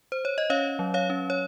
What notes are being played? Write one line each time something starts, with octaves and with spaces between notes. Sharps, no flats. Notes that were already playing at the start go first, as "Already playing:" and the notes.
C5
C#5
D#5
C#4 C#5 F5
F#3
C#5 F5
C#4
C#5